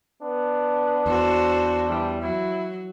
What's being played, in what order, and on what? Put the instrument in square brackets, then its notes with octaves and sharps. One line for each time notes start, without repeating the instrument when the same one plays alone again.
[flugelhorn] B3 [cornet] D4
[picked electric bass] E2 [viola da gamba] F#4 A4 C5
[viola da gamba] E3 [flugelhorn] G3
[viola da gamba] F#3 [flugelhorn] E4